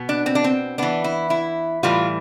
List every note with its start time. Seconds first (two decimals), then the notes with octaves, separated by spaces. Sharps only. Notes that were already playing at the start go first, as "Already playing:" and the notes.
Already playing: B2 B3
0.09 D4
0.26 C4
0.35 D4
0.44 C4
0.78 E3 B3 D4
1.04 E4
1.30 E4
1.83 A2 E3 G3 F4